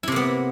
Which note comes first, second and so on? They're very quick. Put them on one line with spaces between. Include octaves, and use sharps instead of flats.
E4 C3 A#3 B3